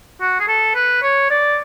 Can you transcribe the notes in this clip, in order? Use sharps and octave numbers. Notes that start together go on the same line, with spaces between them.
F#4
G#4
A4
B4
C#5
D5